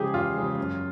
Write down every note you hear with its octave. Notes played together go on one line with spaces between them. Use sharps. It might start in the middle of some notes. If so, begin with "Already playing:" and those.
Already playing: C#3 F3 G#3 G4 G#4
E2 F4
C#3 F3 G#3
F#2